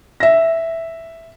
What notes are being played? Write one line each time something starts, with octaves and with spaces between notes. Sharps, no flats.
E5 A#6